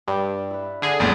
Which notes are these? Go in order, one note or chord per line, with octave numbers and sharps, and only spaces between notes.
G2 D5 G5
E4 B4
D3 G#4
A1 E2 G3 A#3